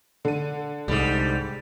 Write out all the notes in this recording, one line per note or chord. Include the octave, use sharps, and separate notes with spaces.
D3 D#7
C2 G#2 G3